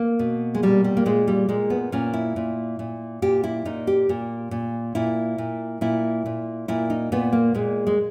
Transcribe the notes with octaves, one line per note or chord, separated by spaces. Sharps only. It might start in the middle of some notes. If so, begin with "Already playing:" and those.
Already playing: A#3
B2
G#3
A#2 G3
G3
A#3
A#2 G#3
G3
A#2 G#3
B3
A#2 C#4
E4
A#2
A#2
A#2 G4
E4
A#2 D#4
G4
A#2
A#2
A#2 E4
A#2
A#2 E4
A#2
A#2 E4
D#4
A#2 B3
A#3
A#2 G#3
G#3